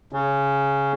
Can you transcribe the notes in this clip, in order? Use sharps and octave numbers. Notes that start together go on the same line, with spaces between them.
C#3